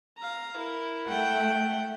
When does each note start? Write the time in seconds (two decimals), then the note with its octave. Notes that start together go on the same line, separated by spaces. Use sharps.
0.17 F5 A#5
0.57 E4 A#4
1.07 A3 F#5 G5